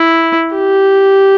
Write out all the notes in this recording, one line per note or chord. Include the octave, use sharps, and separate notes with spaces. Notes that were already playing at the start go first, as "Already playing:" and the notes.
Already playing: E4
G4